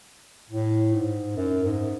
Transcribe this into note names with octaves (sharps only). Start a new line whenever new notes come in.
A2
G#2
F#2
G#2